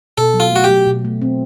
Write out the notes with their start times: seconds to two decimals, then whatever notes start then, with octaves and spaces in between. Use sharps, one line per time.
0.18 B2 A4
0.34 F#3
0.40 F4
0.52 A3 F#4
0.64 F#3 G4
0.86 B2
1.05 A3
1.22 C4